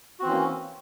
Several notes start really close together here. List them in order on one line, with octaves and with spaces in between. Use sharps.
F#4 C4 E3 C#4 A#3